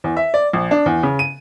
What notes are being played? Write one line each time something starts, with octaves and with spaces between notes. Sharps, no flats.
E2
E5
D5
A#1
D4
E2
C#3
D#7